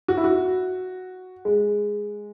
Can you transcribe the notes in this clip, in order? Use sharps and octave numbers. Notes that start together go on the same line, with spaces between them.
F#4
E4
F#4
G#3